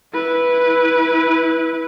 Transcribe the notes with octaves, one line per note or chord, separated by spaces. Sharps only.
E4 B4